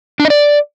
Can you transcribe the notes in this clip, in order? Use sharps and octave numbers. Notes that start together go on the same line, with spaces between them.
D4
D#5
D5